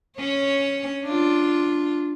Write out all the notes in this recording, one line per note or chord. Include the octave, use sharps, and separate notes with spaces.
C#4 C#5
D4 F4